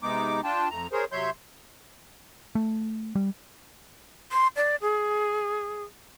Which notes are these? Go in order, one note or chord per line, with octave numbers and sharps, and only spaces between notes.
C3 G#3 B3 D#4 D6
D4 F4 G5 A5
F2 A3 A#5
G#4 A#4 C5 C#5
C3 F#3 C#5 E5 C6 G6
A3
G3
C6
D5
G#4